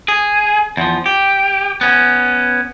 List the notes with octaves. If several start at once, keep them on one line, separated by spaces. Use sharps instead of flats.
G#4
E2 F3
G4
B3 C#4